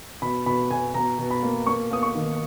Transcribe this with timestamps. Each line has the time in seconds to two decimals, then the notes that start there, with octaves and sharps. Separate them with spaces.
0.22 B2 B5
0.46 B2 B5
0.71 B2 G#5
0.94 B2 A#5
1.18 B2
1.31 B5
1.43 A#3
1.67 A#3 C#6
1.91 A#3 D#6
2.03 C#6
2.15 D#3